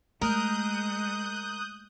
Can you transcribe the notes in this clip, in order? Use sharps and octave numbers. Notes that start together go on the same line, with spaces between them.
G#3 A3 A#4 D#6 F#6 G6